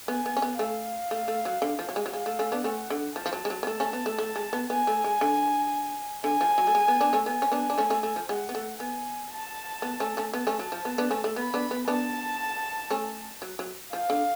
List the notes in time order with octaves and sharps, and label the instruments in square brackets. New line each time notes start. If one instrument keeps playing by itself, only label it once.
[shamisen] B3 [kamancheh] G#5
[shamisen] B3
C#4
B3
[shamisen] A3 C#4 [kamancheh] F5
[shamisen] A3
A3
F#3
D3
F3
F#3
G#3
F#3
[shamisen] G#3 [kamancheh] F5
[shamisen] A3
A3 C#4
B3 D4
[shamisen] A3 C#4 [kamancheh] F#5
[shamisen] D3
[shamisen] F3 [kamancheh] A5
[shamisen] F3
F#3
G#3
F#3
B3
[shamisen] A3 [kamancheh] A5
[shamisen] A3 C#4
B3
A3
A3
G#3
B3
[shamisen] B3 [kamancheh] G#5
[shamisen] A3
G#3
D3
[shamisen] D3 [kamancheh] G#5
[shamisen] F3
F#3
A3
G#3
B3
B3 D4
A3 C#4
[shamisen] B3 [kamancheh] G#5
[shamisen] C#4
B3 D4
D4
A3 C#4
A3 C#4
A3
F3
[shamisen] G#3 [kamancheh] F#5
[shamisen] B3
A3
[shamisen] B3 [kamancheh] G#5
[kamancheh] A5
[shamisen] B3
A3 C#4
A3 C#4
[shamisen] B3 [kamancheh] A5
[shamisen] A3 C#4
F#3
F3
B3
B3 D4
A3 C#4
A3
[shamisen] B3 [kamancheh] B5
[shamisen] B3 D4
B3
[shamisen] B3 D4 [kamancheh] A5
[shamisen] A3 C#4
F#3
F#3
[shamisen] F3 [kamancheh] F5
[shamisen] D3